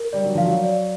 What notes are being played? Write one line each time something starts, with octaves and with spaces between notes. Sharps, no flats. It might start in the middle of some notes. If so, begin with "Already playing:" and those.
Already playing: A#4
G3 D5
F#3
F3 F5
F#3
D5